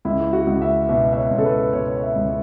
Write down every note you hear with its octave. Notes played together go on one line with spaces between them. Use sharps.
C#2 E4
F#4
C#2
E5
B2 E5
E5
C#5
C#2
A4
B4
B2 C#5
E5
C#2